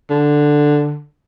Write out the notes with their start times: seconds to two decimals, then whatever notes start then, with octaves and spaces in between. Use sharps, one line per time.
0.10 D3